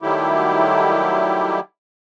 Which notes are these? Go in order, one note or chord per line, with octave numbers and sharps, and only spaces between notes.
D#3 F#3 G3 A3 E4 G4